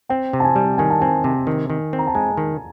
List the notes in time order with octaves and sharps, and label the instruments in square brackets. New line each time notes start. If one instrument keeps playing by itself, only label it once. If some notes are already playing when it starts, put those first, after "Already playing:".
[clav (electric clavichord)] C4 [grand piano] G5
[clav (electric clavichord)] C3
[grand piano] A5
G#5
[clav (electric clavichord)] G3
[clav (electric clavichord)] D#3 [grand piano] G#5
[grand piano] A5
[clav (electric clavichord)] C4 [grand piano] G#5
[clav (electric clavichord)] C3
D#3
D#3
C4
[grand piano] A#5
A5
[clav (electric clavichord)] G#3 [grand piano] G#5
[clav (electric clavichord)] D#3